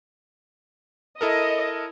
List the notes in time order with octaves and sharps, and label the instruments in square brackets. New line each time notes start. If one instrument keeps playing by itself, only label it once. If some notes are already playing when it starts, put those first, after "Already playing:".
[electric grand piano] E4 A4 A#4 [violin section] D#5